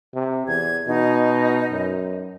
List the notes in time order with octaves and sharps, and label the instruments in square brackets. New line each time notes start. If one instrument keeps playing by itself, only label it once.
[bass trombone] C3
[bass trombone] E2 [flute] G#6
[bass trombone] B2 [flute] D#4
[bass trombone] F#2